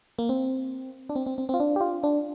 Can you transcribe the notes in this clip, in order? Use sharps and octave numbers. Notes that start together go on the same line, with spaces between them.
A#3
C4
D4
C4
C4
C4
C4
F4
D4
G4
F4
D4